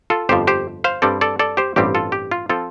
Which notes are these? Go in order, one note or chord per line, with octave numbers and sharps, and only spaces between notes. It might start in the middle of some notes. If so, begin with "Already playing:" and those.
F4 A4
G1 F2 F3 G4 C5
G4 C5
C5 F5
G2 G3 C4 A4 D5
A4 D5
A4 D5
G4 C5
A1 G2 G3 C4 G4
F4 A4
G4
F4
F3 C4 F4 A4